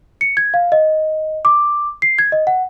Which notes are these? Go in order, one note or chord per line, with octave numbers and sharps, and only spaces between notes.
C#7
G#6
F5
D#5
D6
C7
G#6
D#5
F#5